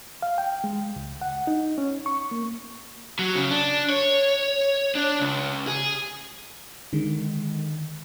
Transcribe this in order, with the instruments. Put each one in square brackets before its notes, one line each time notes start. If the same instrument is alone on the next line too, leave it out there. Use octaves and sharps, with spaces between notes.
[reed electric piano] F5
G5
G#3
C#2
F#5
D#4
C#4
C#6
A#3
[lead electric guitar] F#3
C#3
D4
C#5
D4
C#2
G#4
[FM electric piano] D3 D#3 G#3